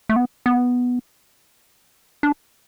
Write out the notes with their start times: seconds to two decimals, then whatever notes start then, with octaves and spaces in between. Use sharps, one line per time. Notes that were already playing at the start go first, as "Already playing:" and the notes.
0.09 A3
0.16 B3
0.46 B3
2.23 D4